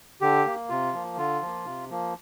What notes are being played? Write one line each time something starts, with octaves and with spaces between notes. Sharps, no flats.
D3 G4
A#3
C3 F4
F3 A#3
D3 F4
F3 A#3
C3
F3 A#3